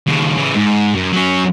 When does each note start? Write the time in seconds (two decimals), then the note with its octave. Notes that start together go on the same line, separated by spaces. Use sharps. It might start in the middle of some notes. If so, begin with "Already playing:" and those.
0.07 D#2 C#3
0.38 C#3 E3
0.55 G#2
0.95 F#2
1.12 F#3 C#4